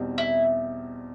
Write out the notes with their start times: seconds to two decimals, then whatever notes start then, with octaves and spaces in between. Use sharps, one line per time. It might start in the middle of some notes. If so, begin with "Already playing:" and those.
Already playing: E2 B2 G3 C4 D#4
0.18 E4